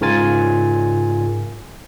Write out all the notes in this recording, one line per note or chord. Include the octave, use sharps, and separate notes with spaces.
G#2 C#3 F4 A#4 G#5 A6